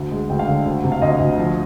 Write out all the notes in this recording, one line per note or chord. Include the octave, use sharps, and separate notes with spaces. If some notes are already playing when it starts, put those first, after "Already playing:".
Already playing: D2
G#3
D2 G5
F5
D3 G5
D2
C3
F5
D2 D#5
D2
F3